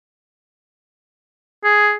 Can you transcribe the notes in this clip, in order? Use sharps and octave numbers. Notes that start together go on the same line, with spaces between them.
G#4